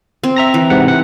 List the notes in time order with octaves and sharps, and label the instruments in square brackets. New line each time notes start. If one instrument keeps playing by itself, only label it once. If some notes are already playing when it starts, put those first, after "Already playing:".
[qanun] C4
[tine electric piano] E5 A#5 A#6
[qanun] E3
[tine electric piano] G#2 C3 F#5
F#5